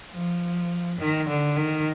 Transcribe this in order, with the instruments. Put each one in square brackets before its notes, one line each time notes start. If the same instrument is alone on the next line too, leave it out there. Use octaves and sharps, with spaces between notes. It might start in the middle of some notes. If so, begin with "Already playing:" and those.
[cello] F3
D#3
D3
D#3